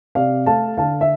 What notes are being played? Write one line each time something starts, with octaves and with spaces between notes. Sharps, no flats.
C3 D5 F5
A3 F5 A5
D3 F5 A5
E5